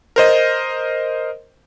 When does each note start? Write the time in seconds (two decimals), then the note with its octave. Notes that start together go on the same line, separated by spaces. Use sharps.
0.16 A#4 C5 D#5